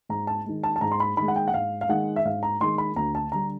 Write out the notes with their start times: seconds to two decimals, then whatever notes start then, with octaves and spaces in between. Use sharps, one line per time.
0.09 G#2 A#5
0.27 A5
0.46 D#3 G#3
0.64 A5
0.76 A5
0.81 G#2 A#5
0.92 C6
1.00 B5
1.17 D#3 B5
1.22 G#3
1.28 F#5
1.36 G5
1.48 F#5
1.54 G#2 F5
1.81 F5
1.89 D#3 G#3 F#5
2.16 E5
2.25 G#2 F5
2.43 A#5
2.60 D#3 G#3 C6
2.78 B5
2.96 D2 A#5
3.15 A5
3.32 D3 G3 A#5